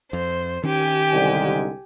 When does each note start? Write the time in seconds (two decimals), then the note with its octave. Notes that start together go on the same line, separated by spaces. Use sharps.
0.13 F2 C5
0.63 D#3 C#4 G4 G#5
1.13 C2 G#2 D3